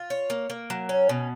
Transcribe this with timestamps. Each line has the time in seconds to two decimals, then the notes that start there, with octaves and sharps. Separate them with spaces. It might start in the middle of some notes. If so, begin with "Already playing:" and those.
Already playing: F4
0.10 C#5
0.30 A#3
0.50 A#3
0.70 F#3
0.89 C#4
1.09 B2